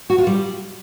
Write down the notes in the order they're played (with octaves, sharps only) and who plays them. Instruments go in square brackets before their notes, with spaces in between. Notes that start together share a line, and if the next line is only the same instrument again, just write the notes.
[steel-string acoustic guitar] F#4
F4
G3